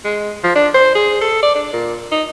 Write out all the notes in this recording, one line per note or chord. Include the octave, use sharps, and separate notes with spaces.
G#3
F3
D4
C5
G#4
A4
D5
D4
A#2
D#4